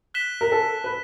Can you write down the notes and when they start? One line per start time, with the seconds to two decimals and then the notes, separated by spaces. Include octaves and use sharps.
0.14 F#6 B6 E7 G7
0.41 A#4
0.52 A4
0.84 B4